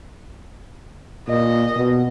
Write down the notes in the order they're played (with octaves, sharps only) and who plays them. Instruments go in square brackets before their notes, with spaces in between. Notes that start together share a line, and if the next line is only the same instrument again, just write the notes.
[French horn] A#2 [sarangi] D#5
[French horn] B2